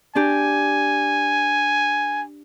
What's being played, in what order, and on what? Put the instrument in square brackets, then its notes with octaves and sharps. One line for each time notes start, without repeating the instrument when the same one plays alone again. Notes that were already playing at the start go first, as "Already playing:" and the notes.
[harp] D4 G4 [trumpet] G#5